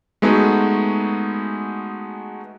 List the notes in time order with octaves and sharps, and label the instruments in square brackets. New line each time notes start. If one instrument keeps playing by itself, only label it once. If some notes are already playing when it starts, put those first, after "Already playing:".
[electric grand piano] G#3 A3 B3 D#4 F#4 G#4